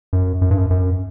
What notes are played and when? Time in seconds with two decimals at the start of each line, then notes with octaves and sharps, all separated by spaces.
0.13 F#2
0.42 F#2
0.51 G2
0.58 F#2
0.70 F#2